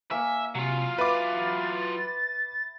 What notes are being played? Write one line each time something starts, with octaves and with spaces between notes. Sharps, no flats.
A#3 C#5 E5 G#5
C3 F#3 F4
B4 E5 B5 D6 A6